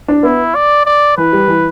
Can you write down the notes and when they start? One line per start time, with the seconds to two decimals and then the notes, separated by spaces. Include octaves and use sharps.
0.08 D4
0.23 B3 E4
0.55 D5
0.86 D5
1.17 E3 B4
1.33 G3
1.48 E3